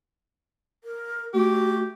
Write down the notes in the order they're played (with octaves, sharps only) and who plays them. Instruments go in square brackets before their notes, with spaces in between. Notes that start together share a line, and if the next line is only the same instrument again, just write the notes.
[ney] A#4
[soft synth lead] A3 [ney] F#4 [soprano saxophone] G4